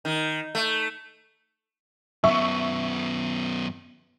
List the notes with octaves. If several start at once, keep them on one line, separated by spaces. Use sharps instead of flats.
D#3
A3
F#2 B3 E5 C#6